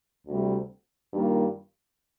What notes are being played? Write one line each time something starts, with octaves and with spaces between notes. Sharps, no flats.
D2 C3 G3
G2 D#3 G3 A#3 F4